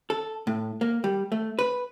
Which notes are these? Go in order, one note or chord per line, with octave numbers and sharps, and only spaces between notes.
A4
A2
A#3
G3
A3
B4